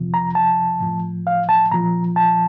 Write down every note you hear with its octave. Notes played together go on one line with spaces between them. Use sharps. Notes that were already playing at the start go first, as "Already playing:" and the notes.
Already playing: F2 C3 F3
A#5
A5
A2 F3
F5
A5
A#2 F3 A#5
A5